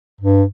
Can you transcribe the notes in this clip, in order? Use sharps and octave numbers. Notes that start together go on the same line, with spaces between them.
G2